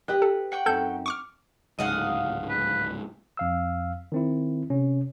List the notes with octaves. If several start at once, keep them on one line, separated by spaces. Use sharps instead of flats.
G4 B4 D#5 F#6
A4
F#5 G5 C#6
F#2 C4 D#4 A4 G6
C#6 D6 F6
D1 C#2 G#2 D#5 F5 F#5
B4
F2 F5 E6
D#3 C4 E4
C3 C#4